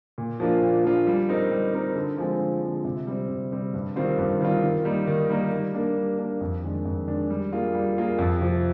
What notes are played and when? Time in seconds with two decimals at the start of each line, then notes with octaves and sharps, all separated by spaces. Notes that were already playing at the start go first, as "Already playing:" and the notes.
0.18 A#2
0.40 F3 A#3 D4 F4
0.62 A#2
0.84 F3 A#3 D4 F4
1.07 G3
1.29 C4 D#4 A#4
1.51 G3
1.74 C4 D#4 A#4
1.96 D3
2.18 F3 G#3 C4
2.40 D3
2.63 F3 G#3 C4
2.85 C3
3.07 G3 C4
3.29 C3
3.52 G3 C4
3.74 G2
3.96 D#3 G3 C4 F4
4.18 G2
4.41 D#3 G3 C4 F4
4.63 D#3
4.85 G3 A#3 D#4
5.07 D#3
5.30 G3 A#3 D#4
5.52 G3
5.74 A#3 D4
5.97 G3
6.18 A#3 D4
6.41 F2
6.63 D#3 G#3 D4
6.85 F2
7.07 D#3 G#3 D4
7.30 G3
7.52 A#3 F4 G#4
7.74 G3
7.97 A#3 F4 G#4
8.19 F2
8.41 C3 F3